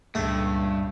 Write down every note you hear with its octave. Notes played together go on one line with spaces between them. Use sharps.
C#2 G2 A#2 A3